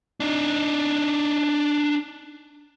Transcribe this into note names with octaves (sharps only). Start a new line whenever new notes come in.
D4 D#4